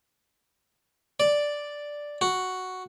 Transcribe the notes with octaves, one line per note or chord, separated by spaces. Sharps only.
D5
F#4